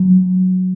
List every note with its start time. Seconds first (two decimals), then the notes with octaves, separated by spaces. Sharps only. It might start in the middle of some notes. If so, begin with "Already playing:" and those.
Already playing: F#3